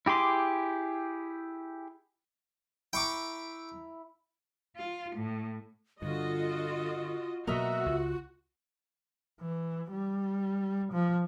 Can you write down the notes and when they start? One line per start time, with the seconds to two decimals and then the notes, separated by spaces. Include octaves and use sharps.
0.06 E4 G4 G#4 C6 D6
2.93 E4 G5 A#5 C#6 D6
4.76 F4
5.16 A2
6.02 G2 D3 F4 F#4 D#5
7.47 B2 F#3 A#3 F#4 A#4 D#5 E5
7.86 C#2 F4
9.41 E3
9.92 G3
10.92 F3